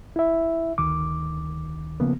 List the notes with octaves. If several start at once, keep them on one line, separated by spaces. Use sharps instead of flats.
E4 E5
D2 D#3 D6
C#3 F3 A#3 B3